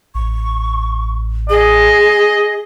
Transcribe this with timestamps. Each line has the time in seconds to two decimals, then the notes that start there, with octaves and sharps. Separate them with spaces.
0.15 A1 C#6
1.50 G#4 D#5